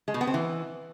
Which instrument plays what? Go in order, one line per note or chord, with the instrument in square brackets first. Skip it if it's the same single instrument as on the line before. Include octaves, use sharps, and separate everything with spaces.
[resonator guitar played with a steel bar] G#3
B2
B3
C4
E3